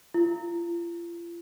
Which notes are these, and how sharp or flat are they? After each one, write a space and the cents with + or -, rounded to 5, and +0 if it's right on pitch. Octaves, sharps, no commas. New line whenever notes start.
F4 -40